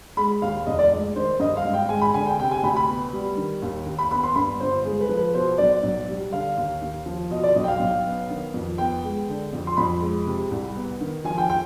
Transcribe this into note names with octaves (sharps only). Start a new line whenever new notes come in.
G#3 B5
D#2 F5
F1 D#5
D5
G#3
D#3 C5
G2 D#5
F5
G#1
G5
G#3 G#5
B5
D3 G#5
G5
C3 G5
G#5
D2 B5
B5
B3
G3
D#3
D#2
D#2
B5
B3 B5
C6
G2 B5
G1 C5
G#3 G#4
B4
F3
B4
B2 C5
B1 D5
B1
G3
D3 F5
D#2
D#2
F3
B2 D#5
D5
B1 D#5
G5
F5
B1
B3
D#3
F2
B3 G5
G#3
D3
F2
C6
F2 B5
G#3
C3
C2
B3
D#3
F3 G#5
G5
G5